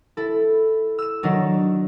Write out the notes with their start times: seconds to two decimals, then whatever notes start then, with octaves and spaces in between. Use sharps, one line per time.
0.17 E4 A4
0.98 E6 E7
1.23 D#3 F#3 D4 D#4